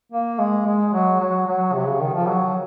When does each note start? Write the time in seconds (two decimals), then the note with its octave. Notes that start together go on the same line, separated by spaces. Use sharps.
0.12 A#3
0.39 G#3
0.66 G#3
0.93 F#3
1.20 F#3
1.47 F#3
1.74 C3
1.87 C#3
2.01 D#3
2.14 F3
2.28 F#3